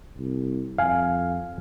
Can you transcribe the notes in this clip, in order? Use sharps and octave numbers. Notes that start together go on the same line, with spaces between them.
C2
F2 F5 G#5